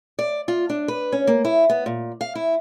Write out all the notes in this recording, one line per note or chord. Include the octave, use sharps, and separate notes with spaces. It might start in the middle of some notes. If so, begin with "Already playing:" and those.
D5
F4
D4
B4
C#4
A#3
E4
B3
A#2
F5
E4